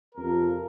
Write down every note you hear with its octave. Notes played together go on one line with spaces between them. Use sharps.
F2 C3 F3 A#4